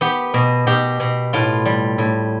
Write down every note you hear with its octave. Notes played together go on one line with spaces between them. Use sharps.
B3 G4
B2
B2 G4
B2
A2 F4
G3
A2